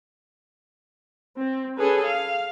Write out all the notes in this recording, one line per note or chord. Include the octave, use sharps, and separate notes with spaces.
C4
C#4 G#4 A4 B4
F5